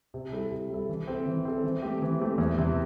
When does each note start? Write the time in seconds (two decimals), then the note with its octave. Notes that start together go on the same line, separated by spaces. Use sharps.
0.14 C3
0.32 G3 E4 A4
0.51 C3
0.70 G3 E4 A4
0.89 E3
1.08 C4 A4
1.26 E3
1.45 C4 A4
1.64 E3
1.82 A3 C4 G4
2.02 E3
2.20 A3 C4 G4
2.38 E2
2.58 C3 E3 C4